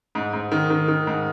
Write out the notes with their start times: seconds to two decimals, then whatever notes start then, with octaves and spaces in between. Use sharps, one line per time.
0.15 G#2
0.33 G#2
0.52 D#3
0.70 D#3
0.88 D#3
1.07 G#2